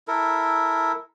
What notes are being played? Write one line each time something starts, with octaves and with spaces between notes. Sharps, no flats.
E4 A4 A#4